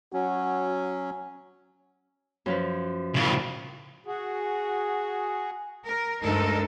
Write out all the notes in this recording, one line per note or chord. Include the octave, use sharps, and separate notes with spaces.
F#3 C#4 F#4
F#2 F3 B4
A2 C#3
F#4 G#4
A#4
D2 G2 G#3 D#4 A4 A#4